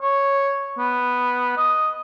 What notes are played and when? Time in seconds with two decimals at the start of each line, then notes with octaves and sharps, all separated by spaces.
0.01 C#5
0.78 B3
1.57 D#5